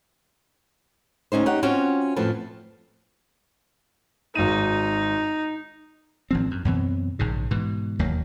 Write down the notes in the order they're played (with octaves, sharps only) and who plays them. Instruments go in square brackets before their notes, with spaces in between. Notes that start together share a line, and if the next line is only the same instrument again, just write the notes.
[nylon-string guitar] D2 C#4 D#4 C5
D#4 G4 C#5 F#5
C4 C#4 F4 F#4
F2 A2 E3 F3 A5
[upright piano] G#1 D#7 [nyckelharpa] D#4
[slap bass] G#1 F3 C4
F#2
F#2 B2 E3 C4
A#1 G#2 C#3
G#2 B2 E3
E1 D#2 F#3 A#3